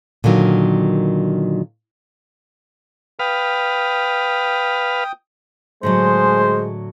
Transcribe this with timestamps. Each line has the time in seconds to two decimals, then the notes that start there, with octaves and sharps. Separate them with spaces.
0.24 A#2 D3 D#3 F#3
3.19 B4 F5 G5 D#6
5.83 A2 D3 F#3 G#3 C5